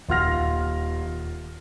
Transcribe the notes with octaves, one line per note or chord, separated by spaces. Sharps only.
D#1 F4 F#5 F6 A#6